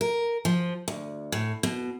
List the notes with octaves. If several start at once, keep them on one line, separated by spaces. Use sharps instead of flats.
A#4
F3
D2
A2
B2